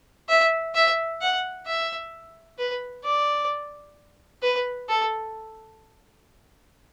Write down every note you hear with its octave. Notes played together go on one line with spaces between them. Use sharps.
E5
E5
F#5
E5
B4
D5
B4
A4